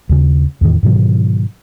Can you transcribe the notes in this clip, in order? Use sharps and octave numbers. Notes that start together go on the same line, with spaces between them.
D#2 C#3
E2 A2 D#3 E3
G#2 B2 D#3 F#3